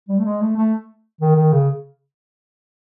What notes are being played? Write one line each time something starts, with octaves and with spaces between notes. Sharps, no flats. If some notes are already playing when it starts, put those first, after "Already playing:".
G3
A3
G#3
A3
A3
D#3
D#3
C#3